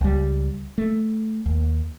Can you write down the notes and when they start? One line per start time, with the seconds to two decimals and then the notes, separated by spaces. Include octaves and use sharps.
0.01 C#2 G3
0.78 A3
1.46 D#2